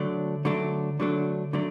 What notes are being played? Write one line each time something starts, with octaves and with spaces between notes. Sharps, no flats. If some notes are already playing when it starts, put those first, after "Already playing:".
Already playing: D3 F#3 A3 D4
D3 F#3 A3 D4
D3 F#3 A3 D4
D3 F#3 A3 D4